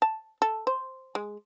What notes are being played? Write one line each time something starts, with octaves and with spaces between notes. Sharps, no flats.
A5
A4
C5
G#3